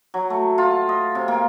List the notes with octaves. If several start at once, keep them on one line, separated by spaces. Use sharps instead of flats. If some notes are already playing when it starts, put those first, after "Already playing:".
F#3
A3
F4
D#5
C3
A#3